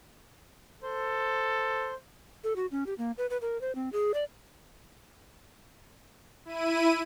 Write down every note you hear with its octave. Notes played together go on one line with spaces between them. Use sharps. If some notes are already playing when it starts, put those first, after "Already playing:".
A4 C5
A4
F#4
C#4
G4
A#3
B4
B4
A#4
C5
C4
G#4
D5
E4 D#7